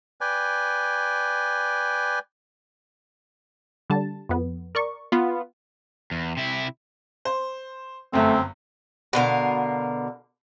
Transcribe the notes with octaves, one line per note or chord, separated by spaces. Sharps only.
B4 D5 G5 G#5
D3 G3 A5
F2 B3
A#4 D5 C#6
B3 F4
E2
C3 E4
C5
G1 F#2 A3 C4
B2 D3 A#4 F5